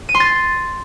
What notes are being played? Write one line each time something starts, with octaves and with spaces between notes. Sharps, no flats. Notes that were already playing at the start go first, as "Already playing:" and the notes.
D#7
C6
A6